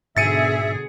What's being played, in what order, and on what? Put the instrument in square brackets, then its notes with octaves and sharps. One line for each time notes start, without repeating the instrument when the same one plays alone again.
[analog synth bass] G#2 [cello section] B2 D3 G#4 [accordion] E5 [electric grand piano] A6 C#7 D#7